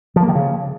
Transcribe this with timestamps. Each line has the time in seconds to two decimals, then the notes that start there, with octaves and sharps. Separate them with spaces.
0.16 F3
0.22 A#3
0.29 D#3
0.35 C#3